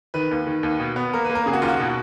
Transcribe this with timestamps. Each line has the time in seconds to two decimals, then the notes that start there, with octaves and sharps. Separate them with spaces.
0.14 D#3 B4
0.31 D#2
0.47 D#3
0.63 D#2
0.80 B2
0.96 B3
1.13 A#3 A#4
1.25 A#3 B4
1.35 A#4
1.46 C#3 G#4
1.53 F#4
1.62 D#2 F4
1.68 F#4
1.80 B2